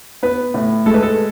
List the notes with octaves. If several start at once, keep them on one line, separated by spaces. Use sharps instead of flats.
B3 B4
A2
G#3 A4
B4
A4